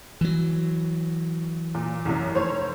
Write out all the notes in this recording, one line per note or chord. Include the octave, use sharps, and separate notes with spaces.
E3 F#3
A#2
C2 F#2
F1 C5 C#5